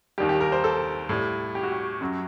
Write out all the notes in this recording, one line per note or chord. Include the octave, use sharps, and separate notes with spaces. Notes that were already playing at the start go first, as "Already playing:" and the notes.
D#2 D#3 G3 G4
G4
A#4
C5
A4
A2 G3
G4
F#4
G4
F#2 F#3